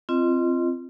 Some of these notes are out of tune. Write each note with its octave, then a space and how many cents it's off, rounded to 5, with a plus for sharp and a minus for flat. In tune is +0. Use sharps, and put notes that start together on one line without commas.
C4 +0 F4 -30 D#5 +0